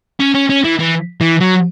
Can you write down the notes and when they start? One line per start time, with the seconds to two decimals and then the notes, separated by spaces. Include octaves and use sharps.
0.20 C#4
0.34 C#4
0.49 C#4
0.64 E3
0.79 E3
1.21 E3
1.40 F#3